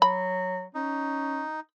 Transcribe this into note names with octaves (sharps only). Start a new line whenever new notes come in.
F#3 B5
C#4 D#4